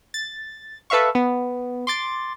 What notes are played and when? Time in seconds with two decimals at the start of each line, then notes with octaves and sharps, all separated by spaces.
0.14 A6
0.90 A4 B4 E5 F5 C#6
1.15 B3
1.87 C6 D6 A6